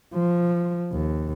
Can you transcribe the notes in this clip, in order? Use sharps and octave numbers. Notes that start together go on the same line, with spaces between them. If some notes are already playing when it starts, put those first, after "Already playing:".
F3
D#2